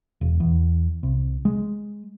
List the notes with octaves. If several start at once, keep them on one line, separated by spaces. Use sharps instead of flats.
E1
E2
C2
G#3